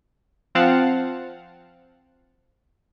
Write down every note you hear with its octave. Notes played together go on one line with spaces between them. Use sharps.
F3 C4 F5 F#5 A5